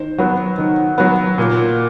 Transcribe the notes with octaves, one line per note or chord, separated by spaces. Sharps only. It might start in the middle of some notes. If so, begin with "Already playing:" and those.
Already playing: D#3 C5
F#3 B3
D#3
F#3 B3
A#2